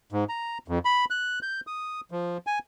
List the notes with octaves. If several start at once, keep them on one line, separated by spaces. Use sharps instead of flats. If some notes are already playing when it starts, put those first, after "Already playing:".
G#2
A#5
F2
B5
F#6
G6
D#6
F3
G#5